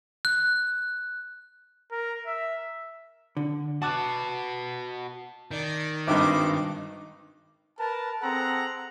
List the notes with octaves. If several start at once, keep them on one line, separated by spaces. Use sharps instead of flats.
F#6
A#4
E5
D3
F#4 B4 A5 D6 F#6
D#3 D5
G#1 G2 D#4 D6
A#4 B4 A5
C4 G#4 A4 F#5 A#5